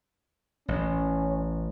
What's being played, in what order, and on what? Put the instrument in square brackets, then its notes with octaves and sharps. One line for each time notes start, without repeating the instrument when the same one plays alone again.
[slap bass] A1 [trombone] C#4